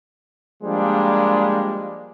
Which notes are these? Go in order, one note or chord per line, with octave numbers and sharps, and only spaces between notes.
F3 G3 G#3 A#3 D4